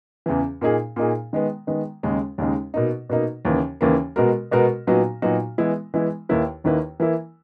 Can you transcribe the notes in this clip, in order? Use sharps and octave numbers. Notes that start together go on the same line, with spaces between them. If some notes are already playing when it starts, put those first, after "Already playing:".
E2 C#3 E3
A#2 A#3 D#4 G#4
A#2 A#3 D#4 G#4
D#3 G#3 B3
D#3 G#3 B3
D#2 C#3 G#3 D#4
D#2 C#3 G#3 D#4
B2 A#3 D#4
B2 A#3 D#4
D#2 C#3 E3 A#3
D#2 C#3 E3 A#3
B2 G#3 B3 F#4 A#4
B2 G#3 B3 F#4 A#4
A#2 F#3 B3 D#4 F#4
A#2 F#3 B3 D#4 F#4
E3 G#3 B3 E4
E3 G#3 B3 E4
D#2 D#3 A#3 E4 B4
D#2 D#3 A#3 E4 B4
E3 A#3 E4